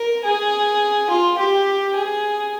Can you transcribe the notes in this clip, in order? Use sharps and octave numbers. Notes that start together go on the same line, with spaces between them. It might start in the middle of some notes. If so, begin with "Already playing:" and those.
Already playing: A#4
G#4
F4
G4
G#4